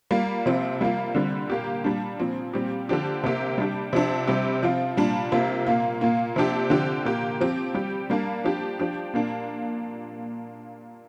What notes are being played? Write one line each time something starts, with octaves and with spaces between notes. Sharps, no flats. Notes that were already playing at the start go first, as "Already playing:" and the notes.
G3 A#3 F4
C3 F3 C4 F4
G3 A#3 F4
D3 G3 C4
A#2 A#3 G4
A#2 G3 D4
A#2 F3 C4
A#2 G3 C4 G4
D3 F3 D4 G4
C3 A#3 G4
G3 D4 G4
C3 F3 D4
C3 G3 C4 G4
F3 C4 F4
A#2 G3 D4 F4
C3 A#3 F4
A#2 A#3 F4
A#2 A#3 F4
C3 F3 D4 G4
D3 F3 C4 G4
A#2 A#3 G4
F3 C4 G4
G3 C4 G4
G3 A#3 D4
F3 D4 G4
F3 D4 G4
A#2 A#3 D4